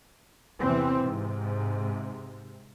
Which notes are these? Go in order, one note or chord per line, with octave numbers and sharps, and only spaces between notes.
E2 C3 E3 C4
G#2 C3